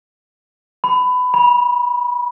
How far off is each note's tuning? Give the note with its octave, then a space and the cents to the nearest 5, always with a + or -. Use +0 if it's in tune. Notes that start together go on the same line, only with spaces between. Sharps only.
B5 +20
B5 -30